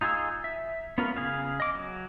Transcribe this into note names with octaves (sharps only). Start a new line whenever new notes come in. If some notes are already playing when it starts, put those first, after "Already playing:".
D#4 F4 G#4 G#5 E6
E5
B3 C#4 F4 A#4 B4
C#3 G#4 F5
D#5 D6
F#3